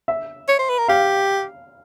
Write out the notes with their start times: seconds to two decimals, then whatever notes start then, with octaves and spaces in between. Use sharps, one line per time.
0.08 E5
0.48 C#5
0.59 C5
0.69 B4
0.78 A#4
0.88 G4 F5